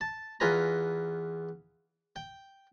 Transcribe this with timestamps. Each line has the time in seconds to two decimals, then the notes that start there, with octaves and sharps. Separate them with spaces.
0.01 A5
0.40 E2 F4 B4 G#5 A#5
2.16 G5